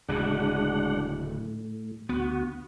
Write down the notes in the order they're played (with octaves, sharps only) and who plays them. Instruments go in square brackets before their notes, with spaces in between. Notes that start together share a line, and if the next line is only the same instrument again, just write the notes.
[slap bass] D1 C#3 [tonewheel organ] G#3 D4 F#5
[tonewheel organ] A2
[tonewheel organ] D2 F#4 [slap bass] B3